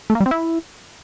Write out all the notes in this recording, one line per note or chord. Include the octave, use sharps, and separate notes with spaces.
A3
A#3
G3
C4
E4